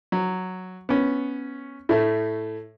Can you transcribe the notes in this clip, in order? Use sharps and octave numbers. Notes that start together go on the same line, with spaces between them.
F#3
B3 C#4
A2 A3